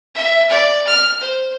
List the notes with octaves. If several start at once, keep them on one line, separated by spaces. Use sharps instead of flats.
E5
D5
F6
C5